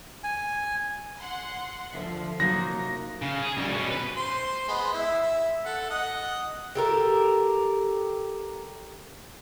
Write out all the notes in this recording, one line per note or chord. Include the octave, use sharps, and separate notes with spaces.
G#5
F#5 C6
D2 D3 F3 E5
C3 F#3 A#3 D#4 F#4 A#6
C#3
G#4
F#2 G3
B2 C#4
B4
C5 C6
G#3 B3
E4 E5
E5
A4 F#5
D#5 F#5
G4 A4 A#4